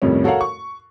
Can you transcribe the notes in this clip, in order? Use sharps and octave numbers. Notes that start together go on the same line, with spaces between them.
F2 A2 C3 D#3 G3 C#4
F#4 A4 A#4 C#5 F5 F#5
C#6